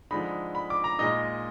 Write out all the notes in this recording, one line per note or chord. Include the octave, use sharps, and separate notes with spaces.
D3 F3 G#3 D#4 B5
B5
D6
A#5
A#2 G#3 D#4 D#5